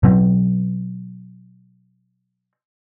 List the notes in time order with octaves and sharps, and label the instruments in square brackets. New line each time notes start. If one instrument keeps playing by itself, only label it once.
[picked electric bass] B2 F#3 C4